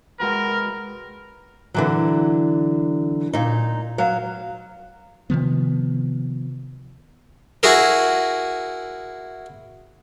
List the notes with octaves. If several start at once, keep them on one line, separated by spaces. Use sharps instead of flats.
G#3 F#4 A#4 B4
D3 E3 F#3
A#2 D#4
F#3 F5
C3 D#3 F3 B3
E4 F#4 G#4 A#4